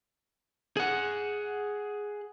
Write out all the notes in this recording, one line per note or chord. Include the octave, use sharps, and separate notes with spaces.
G#4 F#5